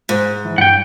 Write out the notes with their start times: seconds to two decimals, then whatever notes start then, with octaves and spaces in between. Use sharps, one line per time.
0.09 G#2
0.45 E3
0.58 G2 F#5 G5